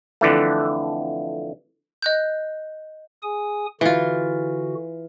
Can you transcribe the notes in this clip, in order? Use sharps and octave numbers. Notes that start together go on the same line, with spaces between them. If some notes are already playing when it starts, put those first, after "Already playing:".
F2 D3 E3 A3
D#5 F#6 G6
G#4 G#5 D#6
D3 E3 F4 F#4